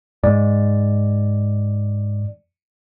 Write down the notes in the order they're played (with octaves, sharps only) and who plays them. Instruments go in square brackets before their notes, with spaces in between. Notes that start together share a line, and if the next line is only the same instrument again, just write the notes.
[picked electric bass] G#2 [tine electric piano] D5